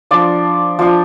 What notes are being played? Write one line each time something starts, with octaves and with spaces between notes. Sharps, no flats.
F3 D4 F4 D5
F3 D4 F4